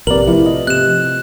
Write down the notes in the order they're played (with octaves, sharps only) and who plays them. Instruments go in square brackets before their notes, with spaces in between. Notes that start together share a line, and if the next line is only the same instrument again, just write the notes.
[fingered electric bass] A#1 [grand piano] C3 B4 [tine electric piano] A#4 D5 [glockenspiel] F#7
[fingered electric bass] F3 A3 [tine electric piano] E4
[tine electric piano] D#5
[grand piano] C3 [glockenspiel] F#6 E7